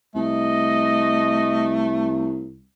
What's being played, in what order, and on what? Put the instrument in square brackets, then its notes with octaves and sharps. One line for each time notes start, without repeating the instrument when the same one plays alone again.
[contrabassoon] C2 [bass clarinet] A3 [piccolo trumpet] D#5